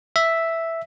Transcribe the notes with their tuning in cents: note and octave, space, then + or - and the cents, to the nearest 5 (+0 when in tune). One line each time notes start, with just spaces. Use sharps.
E5 +0